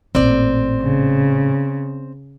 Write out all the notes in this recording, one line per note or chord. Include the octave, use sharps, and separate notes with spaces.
A1 A#2 C4 D5
C#3